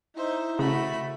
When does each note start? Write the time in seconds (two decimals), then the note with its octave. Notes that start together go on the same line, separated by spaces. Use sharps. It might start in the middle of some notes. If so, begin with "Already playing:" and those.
0.16 D#4 E4 C5 E5
0.59 C#3 A3 F#4 B5